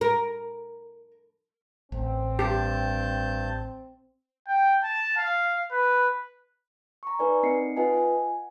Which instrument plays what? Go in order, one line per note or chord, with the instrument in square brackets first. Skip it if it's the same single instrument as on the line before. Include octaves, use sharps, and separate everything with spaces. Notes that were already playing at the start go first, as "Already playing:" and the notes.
[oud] A#4
[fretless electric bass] A1 [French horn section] C4
[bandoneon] G2 A5 G6 [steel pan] G4
[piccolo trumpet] G5
A5
F5
B4
[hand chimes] A#5 C#6
D#4 A#4 B4 D5 G#5
C4 D#4 D#5 C7 C#7
F4 B4 D#5 F#5 G#5 A5
F#5 G#5